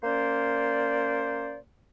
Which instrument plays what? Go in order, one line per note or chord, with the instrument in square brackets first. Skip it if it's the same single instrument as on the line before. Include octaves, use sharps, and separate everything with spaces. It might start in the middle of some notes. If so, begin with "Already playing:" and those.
[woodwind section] A#3 C#4 C5 D5